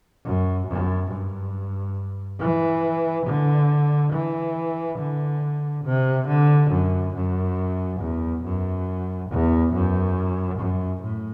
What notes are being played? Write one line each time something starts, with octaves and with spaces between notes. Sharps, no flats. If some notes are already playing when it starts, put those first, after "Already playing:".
F#2
F#2
G2
E3
D3
E3
D3
C3
D3
F#2
F#2
E2
F#2
E2
F#2
F#2
A2